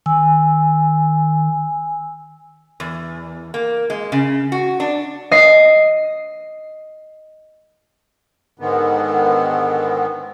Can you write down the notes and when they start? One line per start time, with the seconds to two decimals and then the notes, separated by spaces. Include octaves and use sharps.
0.06 D#3 G#5 E6
2.80 E2
3.54 A#3
3.90 G#3
4.12 C#3
4.52 F#4
4.80 D4
5.31 D#5 C7
8.59 G#2 D3 D#3 B3